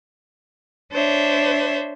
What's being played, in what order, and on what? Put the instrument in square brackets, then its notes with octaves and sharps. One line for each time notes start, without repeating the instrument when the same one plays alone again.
[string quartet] D4 C5 C#5 E5